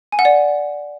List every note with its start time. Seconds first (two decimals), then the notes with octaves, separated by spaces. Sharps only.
0.12 G#5
0.19 F#5
0.25 D5